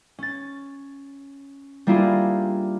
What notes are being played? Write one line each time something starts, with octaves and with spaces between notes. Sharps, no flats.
C#4 A6
G3 A#3 D4 E4 F4 G#4